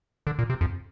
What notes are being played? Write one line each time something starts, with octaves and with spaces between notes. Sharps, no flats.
D3
A#2
C3
F2